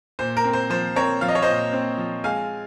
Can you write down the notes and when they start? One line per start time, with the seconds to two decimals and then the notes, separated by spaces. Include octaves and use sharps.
0.19 A#2 C5
0.37 A#4
0.44 C4
0.53 C5
0.70 F3 C5
0.96 C4 A#4 C#5
1.21 F3 F5
1.28 D#5
1.35 C#5
1.42 A#2 C5 D#5
1.73 C4
1.98 F3
2.24 G#3 F5 G#5